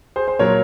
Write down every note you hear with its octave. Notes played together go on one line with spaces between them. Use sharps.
G#4 C5
C5
A#2 F#3 A#4 C#5